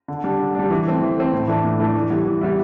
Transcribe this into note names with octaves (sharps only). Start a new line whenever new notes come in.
D3
G3 D4
D3
G3 D4
E3
A3 C4
E3
A3 C4
A2
E3 A3 D4
A2
E3 A3 D4
E3
G3 B3 E4
E3
G3 B3 E4